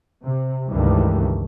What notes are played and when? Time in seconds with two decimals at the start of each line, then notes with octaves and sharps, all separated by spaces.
0.25 C3
0.70 C#2 G2 D#3 E3 G3 A3